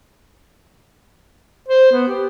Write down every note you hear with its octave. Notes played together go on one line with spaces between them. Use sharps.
C5
B3
G4